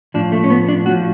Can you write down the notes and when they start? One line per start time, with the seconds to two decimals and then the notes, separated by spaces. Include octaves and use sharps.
0.14 A2 F3 D4
0.32 A3
0.44 C#4
0.50 B3
0.68 D4
0.86 A2 F3 F#4